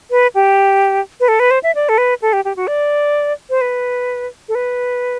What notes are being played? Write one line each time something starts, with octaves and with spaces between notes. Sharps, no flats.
B4
G4
B4
A4
B4
C5
E5
D5
A4
B4
A4
G4
G4
F#4
D5
C5
B4
A4
B4